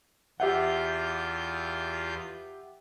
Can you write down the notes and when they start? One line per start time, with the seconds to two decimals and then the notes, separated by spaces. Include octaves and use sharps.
0.40 E2 F4 G4 E5 F#5 G6